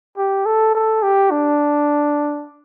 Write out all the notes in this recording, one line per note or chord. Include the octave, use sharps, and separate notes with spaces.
G4
A4
A4
G4
D4